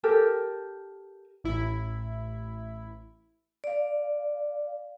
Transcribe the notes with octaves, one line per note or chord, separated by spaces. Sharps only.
G4 A4 A#4
A1 E4
D5 F5